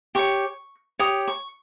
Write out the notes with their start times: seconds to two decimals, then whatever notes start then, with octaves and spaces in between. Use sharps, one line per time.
0.15 G4 C#5 C#6
0.99 G4 C#5 D#6
1.28 C#6